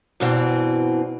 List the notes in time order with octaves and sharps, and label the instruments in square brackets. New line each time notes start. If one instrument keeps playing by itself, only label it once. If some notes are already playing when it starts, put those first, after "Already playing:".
[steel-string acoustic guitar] E2 G2 B2 E3 C4